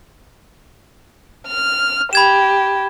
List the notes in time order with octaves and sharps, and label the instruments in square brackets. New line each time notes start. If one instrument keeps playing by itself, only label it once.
[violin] F6
[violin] G4 [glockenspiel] B5 G#6 E7